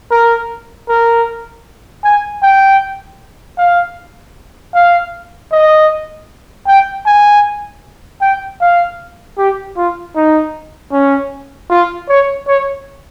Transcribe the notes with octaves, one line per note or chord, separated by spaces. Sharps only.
A#4
A#4
G#5
G5
F5
F5
D#5
G5
G#5
G5
F5
G4
F4
D#4
C#4
F4
C#5
C#5